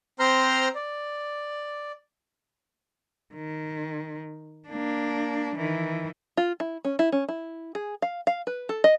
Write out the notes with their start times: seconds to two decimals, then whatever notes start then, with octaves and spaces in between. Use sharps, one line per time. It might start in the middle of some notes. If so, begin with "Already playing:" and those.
0.20 C4 C5 A#5 C6 F6
0.75 D5
3.35 D#3
4.69 A#3 D4
5.57 D#3 E3
6.37 F4
6.60 E4
6.85 C#4
6.99 E4
7.12 C#4
7.29 E4
7.75 G#4
8.02 F5
8.27 F5
8.47 B4
8.69 A4
8.84 D#5